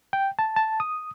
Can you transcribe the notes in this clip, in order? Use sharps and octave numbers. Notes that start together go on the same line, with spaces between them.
G5
A5
A5
D#6